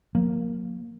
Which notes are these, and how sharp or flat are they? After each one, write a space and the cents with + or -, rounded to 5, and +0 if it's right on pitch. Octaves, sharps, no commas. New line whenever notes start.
F#3 -45 A#3 +0